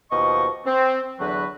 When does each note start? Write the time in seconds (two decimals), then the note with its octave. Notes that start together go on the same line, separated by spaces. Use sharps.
0.11 D#2 B2 F3 D#5 C#6
0.66 C4
1.19 E2 D3 E3 F#3 F#4 B4